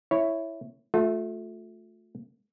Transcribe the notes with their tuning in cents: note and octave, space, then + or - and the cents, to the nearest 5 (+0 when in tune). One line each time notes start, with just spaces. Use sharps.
E4 +0 C#5 +0
A3 -10 F4 +35